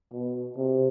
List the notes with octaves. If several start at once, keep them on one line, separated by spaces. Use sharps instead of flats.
B2
C3